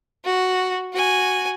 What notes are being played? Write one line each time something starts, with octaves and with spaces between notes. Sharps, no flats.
F#4
F#4 G#5